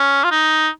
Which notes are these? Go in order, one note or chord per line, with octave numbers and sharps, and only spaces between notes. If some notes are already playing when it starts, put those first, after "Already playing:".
Already playing: C#4
F4
D#4